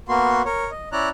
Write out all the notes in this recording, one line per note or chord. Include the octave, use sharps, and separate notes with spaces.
A#3 B3 F#4 C6
A#4 C#5
D#5
C#4 E4 D5 A#5 F#6